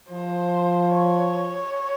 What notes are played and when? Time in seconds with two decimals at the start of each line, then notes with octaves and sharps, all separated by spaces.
0.11 F3 C5
0.93 C#5